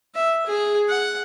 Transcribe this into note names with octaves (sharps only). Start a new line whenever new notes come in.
E5
G#4
F#5